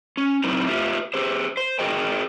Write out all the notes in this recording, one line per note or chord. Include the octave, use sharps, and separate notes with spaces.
C#4
F#3 C4 D#4 E4 A#4 C5
F4 G4 B4 C5 E5
G4 G#4 C5
C5
F#4 G#4 A#4 D#5 G5